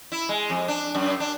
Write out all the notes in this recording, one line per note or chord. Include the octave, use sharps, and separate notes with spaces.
E4
G#3
F2
D4
F#2
D4